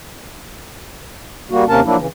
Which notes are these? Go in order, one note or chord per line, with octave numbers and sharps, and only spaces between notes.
G3 A#3 F#4
D#2 C3 A#3 C#4 A#4 A5
F3 F#3 A#3 D4 E4
C#3 E3